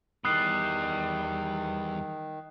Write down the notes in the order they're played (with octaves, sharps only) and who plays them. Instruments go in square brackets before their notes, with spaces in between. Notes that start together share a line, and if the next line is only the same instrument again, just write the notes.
[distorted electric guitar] E2 B3 [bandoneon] D#3 [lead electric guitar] G3 [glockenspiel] D#6 F#6 C7